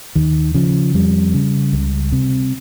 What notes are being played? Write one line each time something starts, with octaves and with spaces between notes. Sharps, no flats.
D#2 D#3
C#3 F3
F2 G3
C#3
C#2
C3